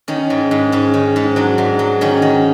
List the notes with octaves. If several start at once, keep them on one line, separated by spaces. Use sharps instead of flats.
D#3 C#4
G#2
G#2
G#2 C#4
D#3
G#2
F#3 D4
G#2
F#3
D#3 C#4
D#3